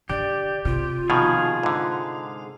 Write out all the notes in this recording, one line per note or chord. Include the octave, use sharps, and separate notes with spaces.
D3 G4 D5
C3 F4
B2 D#3 F3 G#4 F5
G#2 D3